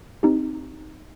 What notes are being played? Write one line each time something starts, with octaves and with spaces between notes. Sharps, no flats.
C4 D#4 G4